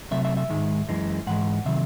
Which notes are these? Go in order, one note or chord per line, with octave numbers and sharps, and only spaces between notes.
C3 F#3 A3 E5
E5
E5
G#2 D#3 G#3
F#2 E3 G#3
G#2 E3 G#3 F#5
C3 D#3 F#3 E5